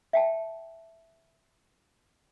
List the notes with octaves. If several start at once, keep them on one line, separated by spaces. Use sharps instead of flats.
E5 G5 A5